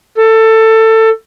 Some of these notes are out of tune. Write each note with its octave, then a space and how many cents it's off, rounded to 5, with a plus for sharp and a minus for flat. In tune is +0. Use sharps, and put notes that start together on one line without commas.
A4 +20